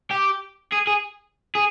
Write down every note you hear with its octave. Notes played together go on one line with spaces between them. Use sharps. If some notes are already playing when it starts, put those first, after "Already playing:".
G4
G#4
G#4
G#4